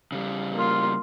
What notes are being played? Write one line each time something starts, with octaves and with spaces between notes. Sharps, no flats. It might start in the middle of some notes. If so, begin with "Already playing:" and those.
C#3 G3
A#3 F4